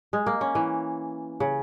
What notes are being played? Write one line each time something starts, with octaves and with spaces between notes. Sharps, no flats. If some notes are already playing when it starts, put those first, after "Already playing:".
G#3
A#3
C#4
E3
C#3